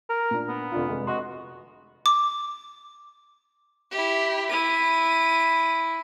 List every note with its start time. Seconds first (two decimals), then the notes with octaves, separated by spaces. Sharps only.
0.10 A#4
0.31 A#2 D4
0.48 B3
0.72 F1 D4 F4
0.89 F1 G#3
1.07 F#4 D#5 C6
2.06 D6
3.92 E4 G4
4.51 E4 D#7